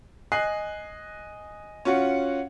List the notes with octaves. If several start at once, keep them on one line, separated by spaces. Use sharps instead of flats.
D#5 G#5 F#6 C7
C#4 F4 F#4 F#5